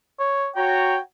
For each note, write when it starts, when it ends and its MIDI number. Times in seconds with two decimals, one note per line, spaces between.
0.19 0.49 73
0.56 0.96 66
0.56 0.96 73
0.56 0.99 79
0.56 0.96 82